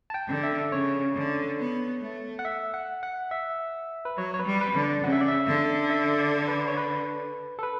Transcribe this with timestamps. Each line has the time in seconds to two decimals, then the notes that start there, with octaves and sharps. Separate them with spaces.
0.10 A5
0.14 G5
0.28 D3
0.43 E5
0.72 C#3 C#5
1.15 D3
1.59 B3
2.01 A3
2.39 F#5
2.45 E5
2.74 F#5
3.03 F#5
3.31 E5
4.05 B4
4.17 F#3 C#5
4.34 C#5
4.39 B4
4.46 G3
4.61 B4
4.75 D3
4.82 D5
5.04 C#3 F#5
5.12 E5
5.21 D5
5.28 E5
5.47 D3
5.90 E5
6.20 D5
6.48 B4
6.68 C#5
6.77 B4
7.59 A4
7.63 B4